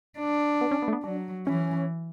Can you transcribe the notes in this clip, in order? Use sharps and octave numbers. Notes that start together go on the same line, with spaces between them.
D4
B3
C#4
B3
A3
B3
F#3 D4
E3 C#4